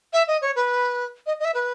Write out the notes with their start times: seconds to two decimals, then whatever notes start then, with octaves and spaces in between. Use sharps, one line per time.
0.13 E5
0.27 D#5
0.42 C#5
0.56 B4
1.26 D#5
1.40 D#5
1.45 E5
1.54 B4